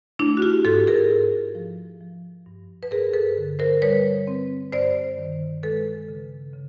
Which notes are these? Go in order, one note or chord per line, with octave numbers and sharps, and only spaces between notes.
A3 D4 E4
F#4
F4 G4
G#2 G4 A4
G#4 A#4
G#2
F3
F3
G2
B4
G2 G#4 A#4
A4 B4
D3
A#4 C5
G3 B4 C#5
C4
G2 C5 D5
D#3
G#3 A4 B4
C#3
C#3